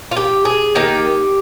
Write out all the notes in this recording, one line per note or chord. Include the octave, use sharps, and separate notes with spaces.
F4
G4
G#4
D#3 A#3 D#4 G4